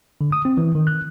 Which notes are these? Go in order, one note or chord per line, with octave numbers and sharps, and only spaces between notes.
D3
D#6
C4
E3
D#3
F#6